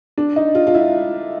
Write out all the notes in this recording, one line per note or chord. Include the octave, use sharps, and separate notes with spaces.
D4
D#4
F4
F4
E4